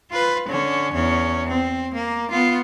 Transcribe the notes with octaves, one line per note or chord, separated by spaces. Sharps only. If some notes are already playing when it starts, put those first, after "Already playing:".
F4 B4
D3 C#4
E2 C#4
C4
A#3
B3 F4